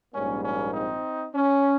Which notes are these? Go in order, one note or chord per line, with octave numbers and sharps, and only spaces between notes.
A#1 G#2 G3 A#3 C#4
C#4
C4 D#4
C#4